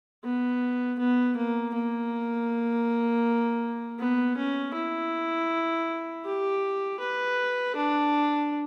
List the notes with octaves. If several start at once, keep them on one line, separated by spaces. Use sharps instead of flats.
B3
B3
A#3
A#3
B3
C#4
E4
G4
B4
D4